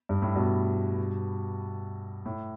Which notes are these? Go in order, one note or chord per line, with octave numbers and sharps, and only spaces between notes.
G2
A2
G2 B2
A2